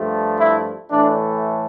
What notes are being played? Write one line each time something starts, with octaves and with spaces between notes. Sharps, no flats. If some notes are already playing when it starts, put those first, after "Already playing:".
Already playing: G2 F3 A3
E4
A2 E3 A3 D4